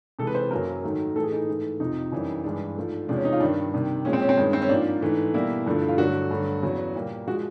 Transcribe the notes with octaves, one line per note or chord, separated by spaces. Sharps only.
C3 E3 G#3 A4
B4
C5
F#2 C#3 F#3 A#3 A#4
G#2 D#3 F#3 A3
A2 E3 A3 A4
G#4
D#4
G#2 E3 A3
F2 C3 F3 D#4
F#2 C#3 E3 G3
G2 E3 G#3 D4
G#2 F3 A3
E2 C3 F3 G#3 D4
C#4
D#4
F4
G2 D#3 G3 D4
C3 D#3 G3
A#2 F3 G#3 C#4
C4
C#4
C4
G2 D#3 G#3 C#4
C4
C#4
G#2 F3 A#3 D4
G#2 E3 A3
B2 G3 A#3 E4
G2 D3 F3 A3
F4
G2 D3 F#3 A3 F#4
G2 D3 F#3 A3
E2 C#3 F#3
A#2 G3 A#3
F3 G#3 F#4